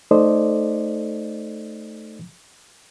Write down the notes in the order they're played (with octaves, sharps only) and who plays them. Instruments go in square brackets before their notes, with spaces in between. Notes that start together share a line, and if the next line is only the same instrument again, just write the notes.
[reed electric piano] A3 D#4 A4 C5 D5 D#5